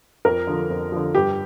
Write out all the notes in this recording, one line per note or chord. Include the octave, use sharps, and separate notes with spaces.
F2 A#4
D3 F3
F2
D3 F3
G2 G4